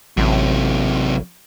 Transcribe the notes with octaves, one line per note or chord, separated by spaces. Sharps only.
A1 C3 F#3